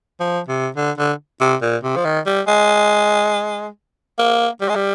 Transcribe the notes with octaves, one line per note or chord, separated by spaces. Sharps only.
F3
C3
D3
D3
C3
A#2
C3
F3
D#3
G3
G#3
A#3
G3
G#3
G3